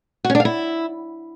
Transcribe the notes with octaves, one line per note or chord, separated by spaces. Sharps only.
F#4
C#4
D4
F5
E4